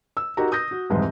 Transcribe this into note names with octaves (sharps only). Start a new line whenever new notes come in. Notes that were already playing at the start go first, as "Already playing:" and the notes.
E6
D#4 F#4 G4 A#4 A#5
D#6 G6 A#6
F#4
C2 F2 G#2 E3